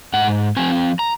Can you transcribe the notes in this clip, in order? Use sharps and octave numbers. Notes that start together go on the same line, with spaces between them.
G#2 F#5
F3 C4 G#5
A#5